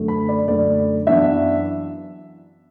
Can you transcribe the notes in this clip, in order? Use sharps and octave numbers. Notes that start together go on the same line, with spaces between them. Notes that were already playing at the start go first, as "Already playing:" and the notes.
Already playing: F#2 D3 A3
B5
D5
F#2 D3 A3 D5
F#2 E3 B3 D4 E5